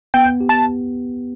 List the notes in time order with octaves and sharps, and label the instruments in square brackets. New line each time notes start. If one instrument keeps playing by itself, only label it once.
[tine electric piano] B3 [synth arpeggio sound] G5
[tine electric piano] G4
[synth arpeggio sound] A5